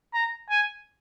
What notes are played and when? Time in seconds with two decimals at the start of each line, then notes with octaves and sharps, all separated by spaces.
0.14 A#5
0.50 G#5